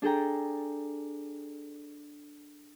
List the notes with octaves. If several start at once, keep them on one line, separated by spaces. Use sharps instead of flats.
D4 G#4 A4 G5 A#5